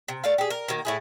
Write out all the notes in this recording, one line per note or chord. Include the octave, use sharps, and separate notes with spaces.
C3
A3 D5 F5
G4 G#4
A#4
D#3 F#3 A#3
A2 E4 G#4